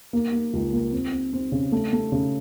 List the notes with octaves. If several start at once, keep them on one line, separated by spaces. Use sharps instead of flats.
A#3
A#3
C#2
A#3
C4
C4
C4
C#3
A3
A3
C#3